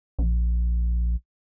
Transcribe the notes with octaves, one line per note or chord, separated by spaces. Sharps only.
A#1